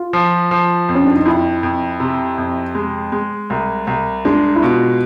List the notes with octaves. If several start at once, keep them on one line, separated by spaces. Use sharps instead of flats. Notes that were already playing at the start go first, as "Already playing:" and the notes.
Already playing: F4
F3
F3
F2
C#4
D4
D#4
F2 E4
F2
C3
F2
G#3
G#3
C2
C2
G#3 D4
E4
B2 F4